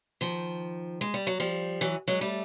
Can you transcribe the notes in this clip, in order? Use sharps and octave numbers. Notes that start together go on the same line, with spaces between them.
D#3 F3
G#3
G3
F#3
F3 G3
E3 F#3
F#3 G#3
G3 A3